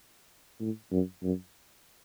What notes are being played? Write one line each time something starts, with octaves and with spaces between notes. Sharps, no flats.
A2
F#2
F#2